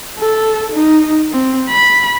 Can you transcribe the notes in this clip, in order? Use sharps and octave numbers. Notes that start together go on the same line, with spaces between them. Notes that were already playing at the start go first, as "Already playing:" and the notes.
A4
D#4
C4
B5